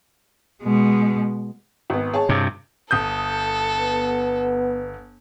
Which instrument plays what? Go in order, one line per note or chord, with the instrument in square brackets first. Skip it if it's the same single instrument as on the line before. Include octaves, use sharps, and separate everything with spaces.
[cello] B2 G#3
[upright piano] G#1 B3
G#4 C#5 A5
[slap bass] G2 C3
[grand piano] G1 D#6 G6 [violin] A4
[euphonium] B3